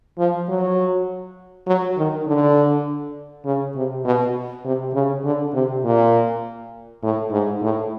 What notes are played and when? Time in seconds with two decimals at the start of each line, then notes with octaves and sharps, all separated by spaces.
0.18 F3
0.49 F#3
1.67 F#3
1.97 D#3
2.27 D3
3.45 C#3
3.76 C3
4.05 B2
4.65 C3
4.94 C#3
5.24 D3
5.54 C3
5.84 A#2
7.03 A2
7.32 G#2
7.62 A2